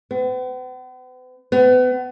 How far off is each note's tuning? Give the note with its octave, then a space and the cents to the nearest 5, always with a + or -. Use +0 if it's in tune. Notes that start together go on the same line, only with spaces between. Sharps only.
B3 +45
B3 +35